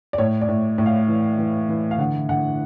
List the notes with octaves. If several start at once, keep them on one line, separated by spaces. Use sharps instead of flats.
D5
A2 C#5
D5
A2
A2
F5
E3
E3
E3
F5
D3 F#5
D3 F#5